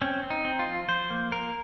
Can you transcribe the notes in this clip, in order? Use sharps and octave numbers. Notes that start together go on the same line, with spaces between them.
C4 C#4
C4
D#4
C4
F4
F3
F3 C5
A#3
A#3 A#4